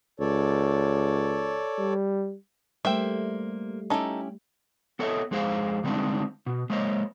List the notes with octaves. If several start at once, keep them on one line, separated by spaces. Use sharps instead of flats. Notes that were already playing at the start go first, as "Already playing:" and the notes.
C#2 A4 C#5 D5
G3
G3 A3 A#3 C5 E5 G5
C#4 D#4 E4 G4 A4
B3 A4 C#5 D#5 E5
F2 G#3 G#4 C5 F5
D3 G3 G#3 C4 D4 D#4
B2
G#3 A#3 C5 C#5 D#5